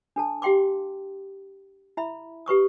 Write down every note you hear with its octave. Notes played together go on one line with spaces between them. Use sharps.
D4 A4 A5
G4 F5 G5 C6 D6
E4 E5 B5
G4 B4 C#6 D#6